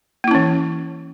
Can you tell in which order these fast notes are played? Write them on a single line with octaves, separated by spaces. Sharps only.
A#3 E4 C#4 E3